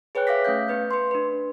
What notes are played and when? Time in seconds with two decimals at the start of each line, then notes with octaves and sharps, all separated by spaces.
0.15 G#4 B4 C#5 G5 F#6
0.27 E5 F5 D6 A#6 B6
0.45 A3 C#4 F5 G6
0.68 B3 B4 G6
0.91 B4 C6
1.11 D4 B4